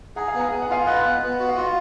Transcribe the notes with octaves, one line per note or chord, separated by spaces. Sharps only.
G#4 F#5 A#5
F5 G#5
B3
F#5 A#5
B3 G#5
F#5
F4 F5 G#5
B4 D#5 F#5
B3
B3
F#4
F5
F4 D#5 F#5